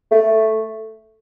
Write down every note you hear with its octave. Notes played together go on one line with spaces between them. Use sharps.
A3